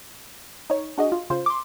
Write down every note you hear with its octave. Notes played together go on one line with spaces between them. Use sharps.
D#4 C#5
D4 F#4 G#4 D#5
F4
C#3 F4 C5
C6 D6